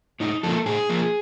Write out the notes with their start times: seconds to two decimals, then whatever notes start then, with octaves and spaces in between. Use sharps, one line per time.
0.20 A2 D#4
0.43 F3 A#3 A4
0.66 A2 G#4
0.89 F3 A#3